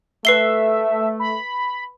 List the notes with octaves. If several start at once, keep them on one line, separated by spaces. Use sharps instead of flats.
A3 B4 E5 C7 G7
B5